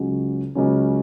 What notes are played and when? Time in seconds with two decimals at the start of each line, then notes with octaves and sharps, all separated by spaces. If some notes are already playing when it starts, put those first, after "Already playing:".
Already playing: C#2 C#3 F#3 C#4
0.55 C#2 C#3 F#3 C#4